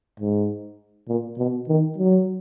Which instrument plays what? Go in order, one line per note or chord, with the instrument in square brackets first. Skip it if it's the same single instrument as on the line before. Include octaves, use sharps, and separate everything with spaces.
[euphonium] G#2
A#2
B2
D#3
F#3